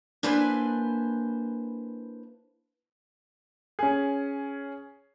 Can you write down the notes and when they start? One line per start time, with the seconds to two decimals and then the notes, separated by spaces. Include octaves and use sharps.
0.23 A#3 D4 E4 B4 C5 G#5
3.79 C#4 G#4